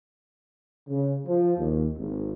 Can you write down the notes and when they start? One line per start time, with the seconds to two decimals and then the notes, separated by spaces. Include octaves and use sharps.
0.88 C#3
1.26 F3
1.58 D#2
1.98 G#1